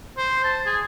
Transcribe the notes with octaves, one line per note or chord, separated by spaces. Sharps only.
C5
A5
G#4